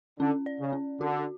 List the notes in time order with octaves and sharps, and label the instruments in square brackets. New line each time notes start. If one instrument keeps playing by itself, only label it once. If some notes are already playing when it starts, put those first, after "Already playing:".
[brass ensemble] D3 [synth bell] C#4
[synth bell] D5
[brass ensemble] C#3
[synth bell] C#4
[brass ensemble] D3 [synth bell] F#4